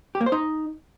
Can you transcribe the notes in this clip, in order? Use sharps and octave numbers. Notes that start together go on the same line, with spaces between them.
G4
A#3
C5
D#4